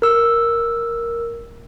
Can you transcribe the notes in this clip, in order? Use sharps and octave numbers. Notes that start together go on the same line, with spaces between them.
A#4 E6